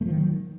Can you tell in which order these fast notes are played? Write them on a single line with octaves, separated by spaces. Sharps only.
A3 F3 D#3 F#3